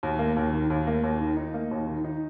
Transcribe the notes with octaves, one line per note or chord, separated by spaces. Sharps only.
D#2
A#3
D#2
D#3
D#2
A#3
D#2
D#3
D#4
A#3
D#2
D#3
D#4